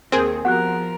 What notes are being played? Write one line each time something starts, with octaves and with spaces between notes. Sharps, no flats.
D#2 C4 G#4 A#4
F3 B3 F#4 G4 A#4 F#5 F#6